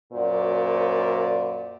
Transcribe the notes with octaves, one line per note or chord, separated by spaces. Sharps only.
F#2 A#2 F#4 C5 D5